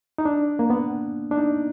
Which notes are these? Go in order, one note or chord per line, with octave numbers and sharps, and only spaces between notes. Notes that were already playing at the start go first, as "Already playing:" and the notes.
D#4
D4
A#3
B3
D4
D#4